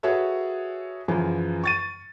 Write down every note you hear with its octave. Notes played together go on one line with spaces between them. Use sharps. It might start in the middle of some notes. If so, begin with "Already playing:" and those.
F#4 G#4 A4 B4 C#5 E5
F#2 C#3 E3 F3
C#6 A6 D#7